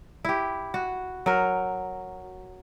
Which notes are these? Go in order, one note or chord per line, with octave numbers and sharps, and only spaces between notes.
E4 G4
F#4
F#3 A#4